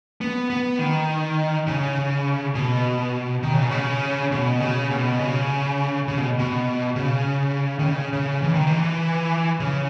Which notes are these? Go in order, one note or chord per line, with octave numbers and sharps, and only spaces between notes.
B3
B3
D#3
C#3
B2
D#3
C#3
B2
C#3
B2
C#3
B2
C#3
C#3
B2
B2
C#3
D#3
C#3
C#3
E3
D#3
E3
C#3